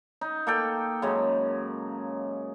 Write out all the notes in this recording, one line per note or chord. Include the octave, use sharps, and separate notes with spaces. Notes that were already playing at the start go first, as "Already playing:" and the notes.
D#4
A#3 A4 G5
F#2 C#3 G#3